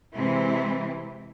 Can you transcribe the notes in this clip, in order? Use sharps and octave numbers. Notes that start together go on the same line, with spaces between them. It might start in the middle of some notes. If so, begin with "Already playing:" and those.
C3 E3 G#3 C4 E4